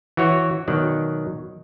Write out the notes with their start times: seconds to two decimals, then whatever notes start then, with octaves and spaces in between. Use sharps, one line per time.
0.17 E3 F#4 C#5
0.68 B2 D#3 F#3 D5